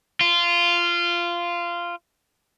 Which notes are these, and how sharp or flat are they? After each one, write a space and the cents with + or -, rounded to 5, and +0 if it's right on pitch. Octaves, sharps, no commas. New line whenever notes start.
F4 -15